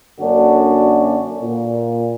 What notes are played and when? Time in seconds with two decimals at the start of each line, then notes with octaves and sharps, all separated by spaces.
0.20 F#2 D3 A#3 C#4 D4 F#4
1.42 A#2